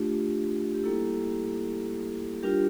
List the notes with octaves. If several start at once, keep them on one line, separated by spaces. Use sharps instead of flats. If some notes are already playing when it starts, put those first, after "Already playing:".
Already playing: A3 D4 F4 G4
G4
G3 A#3 E4 A4
G3 D4 F4 G4 A#4